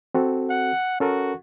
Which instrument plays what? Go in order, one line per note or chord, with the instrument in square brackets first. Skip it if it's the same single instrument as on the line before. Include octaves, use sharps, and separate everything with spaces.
[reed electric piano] C4 F#4 A4
[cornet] F#5
[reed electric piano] C#4 A4 A#4 [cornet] F#4